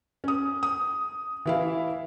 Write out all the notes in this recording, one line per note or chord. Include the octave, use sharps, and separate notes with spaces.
C#4 D#6
D#6
E3 E4 F5